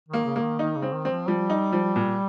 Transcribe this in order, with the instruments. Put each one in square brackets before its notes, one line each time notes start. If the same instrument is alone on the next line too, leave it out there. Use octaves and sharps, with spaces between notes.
[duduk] D#3
[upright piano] A#3
[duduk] C#3
[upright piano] A#3
[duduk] D#3
[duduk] D#3 [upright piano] D#4
[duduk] C#3
[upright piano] C4
[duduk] D#3
[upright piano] C4
[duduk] F3
[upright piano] F3 [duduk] G3
[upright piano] D#4
F3
A#2